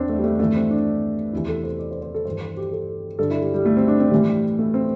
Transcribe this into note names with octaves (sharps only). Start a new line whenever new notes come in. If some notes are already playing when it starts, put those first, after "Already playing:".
Already playing: E2 E3 C4 D4
A3
G3
A3
G2 E3 A3
C4
D4
E2 C3 E3 E4
A4
C5
D5
C5
C5
A4
G2 E3 C5
C5
G4
A4
G2 D3 A4
E4
G3
G3
A3
C4
D4
C4
A2 E3 G3
A3
C4